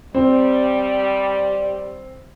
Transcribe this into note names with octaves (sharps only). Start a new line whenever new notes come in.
G3 C4